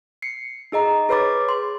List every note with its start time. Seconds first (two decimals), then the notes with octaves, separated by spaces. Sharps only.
0.22 C7 C#7
0.72 D#4 G#4 D#5 A#5
1.09 G#4 B4 C#5 B5 D6 A6
1.49 C6